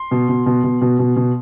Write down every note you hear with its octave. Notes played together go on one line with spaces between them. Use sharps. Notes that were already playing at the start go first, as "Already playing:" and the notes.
Already playing: C6
B2
B2
B2
B2
B2
B2
B2